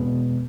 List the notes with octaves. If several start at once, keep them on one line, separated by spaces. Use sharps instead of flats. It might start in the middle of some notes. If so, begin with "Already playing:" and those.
Already playing: E2 B2 G#3 B3